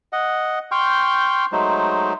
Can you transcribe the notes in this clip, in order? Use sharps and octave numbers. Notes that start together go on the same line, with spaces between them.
D#5 F#5
G5 C6 C#6 F6 G6
F#3 G#3 A3 D#4 C5